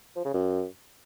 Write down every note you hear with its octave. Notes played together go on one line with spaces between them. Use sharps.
F3
C#3
F#2